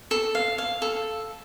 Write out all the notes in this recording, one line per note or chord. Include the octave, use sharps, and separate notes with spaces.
A4
F5
F5
A4